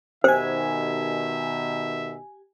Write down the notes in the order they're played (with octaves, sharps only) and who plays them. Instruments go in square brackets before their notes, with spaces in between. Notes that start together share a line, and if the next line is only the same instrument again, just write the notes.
[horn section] B2 D#3 [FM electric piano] G4 G#5 [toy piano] C5 [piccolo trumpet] E5